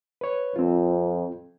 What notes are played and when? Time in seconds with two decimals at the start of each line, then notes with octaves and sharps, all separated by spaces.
0.21 B4 C#5
0.56 F2 C4 F4